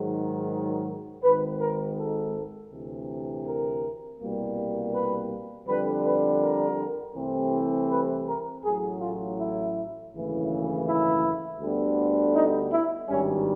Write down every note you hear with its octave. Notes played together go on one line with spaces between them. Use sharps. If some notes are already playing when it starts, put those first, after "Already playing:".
Already playing: G#2 D#3 F#3
G#1 G#2 D#3 G#3 B4
A#4
A4
D2 C3 E3
A#4
C2 B2 G3 A#3
B4
F2 D3 G3 B4
B4
A#4
C2 C3 E3 A3 C4
B4
A#4
A1 A2 F#3 G#4
F4
E4
G#1 F#2 C#3 E3 A3
E4
D2 D3 G3 B3
D#4
E4
G#1 G2 D#3 G3 C#4